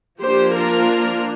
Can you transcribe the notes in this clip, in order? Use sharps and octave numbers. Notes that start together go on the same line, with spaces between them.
F3 A#3 D4 G4 C5
F4 A#4